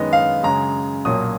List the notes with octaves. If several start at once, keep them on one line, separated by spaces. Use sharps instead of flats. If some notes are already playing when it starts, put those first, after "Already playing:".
Already playing: F#2 D#3 G#3 B3 D#5
F5
F#2 C#3 G#3 A#5
B1 A#2 F#3 A#3 D#6